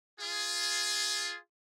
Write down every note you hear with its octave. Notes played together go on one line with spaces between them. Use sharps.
F4 G#4